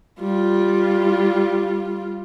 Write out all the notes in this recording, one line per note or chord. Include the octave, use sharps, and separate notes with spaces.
G3 F4